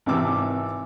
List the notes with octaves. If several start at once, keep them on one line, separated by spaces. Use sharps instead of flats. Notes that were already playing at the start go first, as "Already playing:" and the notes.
G#1 C3 E3 D6 E6